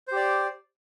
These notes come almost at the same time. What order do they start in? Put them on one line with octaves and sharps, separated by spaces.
C5 G4 D5